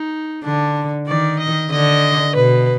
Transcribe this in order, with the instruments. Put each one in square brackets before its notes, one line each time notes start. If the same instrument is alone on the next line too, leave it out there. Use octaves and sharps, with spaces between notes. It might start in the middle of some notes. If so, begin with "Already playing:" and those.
Already playing: [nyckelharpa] D#4
[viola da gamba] D3 [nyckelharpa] D4
[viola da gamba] D#3 [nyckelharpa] D5
[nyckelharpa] D#5
[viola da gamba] D3 [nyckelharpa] D#5
[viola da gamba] B2 [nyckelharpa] B4